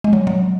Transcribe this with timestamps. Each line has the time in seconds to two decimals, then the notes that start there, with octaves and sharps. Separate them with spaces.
0.04 G#3
0.13 F#3
0.27 F#3